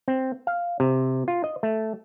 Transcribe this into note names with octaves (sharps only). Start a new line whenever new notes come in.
C4
F5
C3
F4
D#5
A3